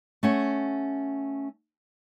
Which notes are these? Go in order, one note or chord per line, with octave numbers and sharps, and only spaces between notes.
A3 C#4 F#5